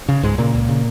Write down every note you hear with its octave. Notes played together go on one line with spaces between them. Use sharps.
C#3
C#2 G#2 G#3
A#2 C#3 A#3
C#2
C#3